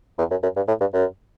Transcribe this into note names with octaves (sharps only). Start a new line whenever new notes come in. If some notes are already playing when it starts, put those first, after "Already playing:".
E2
F#2
F#2
G2
A2
G2
F#2